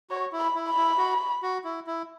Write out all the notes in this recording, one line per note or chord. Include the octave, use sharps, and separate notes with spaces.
F#4 C#5
E4
B5
E4
B5
E4
F#4
F#4
E4
E4